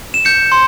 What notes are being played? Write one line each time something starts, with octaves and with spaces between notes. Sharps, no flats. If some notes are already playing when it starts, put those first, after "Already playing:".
E7
G6 C#7
C6